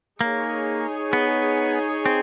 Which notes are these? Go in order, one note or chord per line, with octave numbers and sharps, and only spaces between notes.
A#3 D#4 G#4 C#5
B3
C4